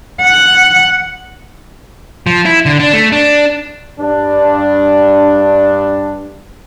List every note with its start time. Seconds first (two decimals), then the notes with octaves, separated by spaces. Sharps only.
0.21 F#5
2.27 F3
2.46 E4
2.66 D3
2.79 D4
2.93 A3
3.12 D4
3.99 G2 D4